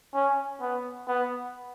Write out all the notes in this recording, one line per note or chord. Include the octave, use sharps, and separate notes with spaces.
C#4
B3
B3